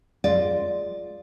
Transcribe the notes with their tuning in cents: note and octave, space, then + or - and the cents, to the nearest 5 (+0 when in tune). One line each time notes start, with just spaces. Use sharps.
G#3 +0 F4 +0 D5 +0